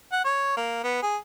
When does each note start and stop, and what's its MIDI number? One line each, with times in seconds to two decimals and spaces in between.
0.12 0.24 78
0.25 0.52 73
0.57 0.80 58
0.84 1.03 59
1.03 1.17 68